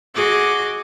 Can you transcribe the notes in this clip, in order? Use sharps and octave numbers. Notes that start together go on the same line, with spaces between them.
F#4 G#4 D#5 D6